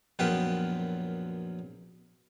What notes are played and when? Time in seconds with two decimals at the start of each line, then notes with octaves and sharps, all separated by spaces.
0.19 A#1 F#2 B3 F4 B4 G5